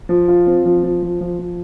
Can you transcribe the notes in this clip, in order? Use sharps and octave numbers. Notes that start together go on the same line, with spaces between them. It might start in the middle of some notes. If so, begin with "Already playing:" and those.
F3
F4
C4
F3
F3
F3
F3
F3